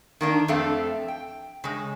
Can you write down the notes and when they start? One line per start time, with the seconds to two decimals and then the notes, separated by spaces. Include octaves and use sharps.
0.21 D#3 A#3 D4
0.48 F2 A3 C4 D4 A4 F5
1.08 G5
1.64 C#3 G#3